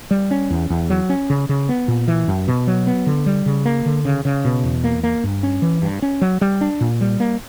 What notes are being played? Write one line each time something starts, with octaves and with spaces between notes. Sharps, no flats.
G3
C#4
E2
E2
F#3
C#4
C#3
C#3
B3
A#2
E3
F#2
B2
F#3
B3
D3
G3
C#3
A#3
D3
C#3
C#3
B2
E2
A#3
A#3
G2
C#4
E3
G2
C#4
F#3
G3
D4
A#2
G3
A#3